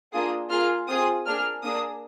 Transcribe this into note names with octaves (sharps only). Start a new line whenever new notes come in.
A#3 D4 F4 G#4 D#6
A#3 F4 G#4 F6
C4 F4 G#4 D#6
A#3 D4 G#4 F6
A#3 D4 G#4 D#6